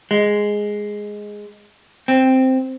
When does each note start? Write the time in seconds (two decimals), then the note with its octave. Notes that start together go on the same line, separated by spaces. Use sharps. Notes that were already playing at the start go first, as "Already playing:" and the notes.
0.11 G#3
2.08 C4